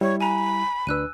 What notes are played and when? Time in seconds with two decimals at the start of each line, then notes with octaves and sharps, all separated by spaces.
0.01 G3 E4 C#5
0.20 G#5 A#5 B5
0.87 D2 D4 B4 E6 F#6 D#7